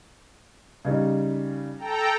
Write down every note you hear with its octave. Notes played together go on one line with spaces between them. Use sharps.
C#3 G3 D#4
A4 G5 A#5